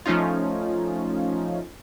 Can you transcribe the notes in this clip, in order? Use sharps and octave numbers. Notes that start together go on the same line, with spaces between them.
F3 A3 C#4 D#4 F4